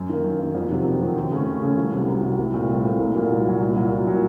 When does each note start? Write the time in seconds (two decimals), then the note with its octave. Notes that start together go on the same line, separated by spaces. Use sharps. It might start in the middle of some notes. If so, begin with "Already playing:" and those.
Already playing: F#2
0.09 D#3 A#3
0.24 F#2
0.39 D#3 A#3
0.55 F2
0.70 C3 D#3 F#3 C4
0.85 F2
1.00 C3 D#3 F#3 C4
1.16 D#2
1.31 C#3 A3 C#4
1.47 D#2
1.62 C#3 A3 C#4
1.77 C2
1.92 C3 F#3
2.08 C2
2.23 C3 F#3
2.38 C2
2.54 A#2 A3 C4
2.69 C2
2.84 A#2 A3 C4
2.99 C2
3.15 A#2 F#3 A#3
3.30 C2
3.45 A#2 F#3 A#3
3.61 C2
3.76 A#2 F#3
3.91 C2
4.07 A#2 F#3